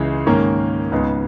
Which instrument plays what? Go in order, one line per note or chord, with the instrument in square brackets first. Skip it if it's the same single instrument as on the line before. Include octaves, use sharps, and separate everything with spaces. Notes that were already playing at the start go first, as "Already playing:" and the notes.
Already playing: [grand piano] C#2 C#3 E3 G#3
G#2 D#3 A#3 C#4
C#2 C#3 G#3 B3 D#4